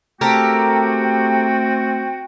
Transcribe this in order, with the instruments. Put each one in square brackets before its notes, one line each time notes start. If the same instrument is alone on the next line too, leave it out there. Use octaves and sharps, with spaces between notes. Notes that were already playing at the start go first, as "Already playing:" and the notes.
[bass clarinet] A3 [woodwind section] C4 F#4 G5 [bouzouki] G4 A4 A#4